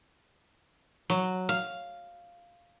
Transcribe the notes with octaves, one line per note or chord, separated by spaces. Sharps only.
F#3
F5